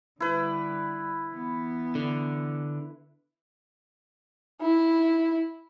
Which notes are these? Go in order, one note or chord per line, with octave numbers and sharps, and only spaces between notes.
D3 G3 E4 B4
E3 B3
D3
E4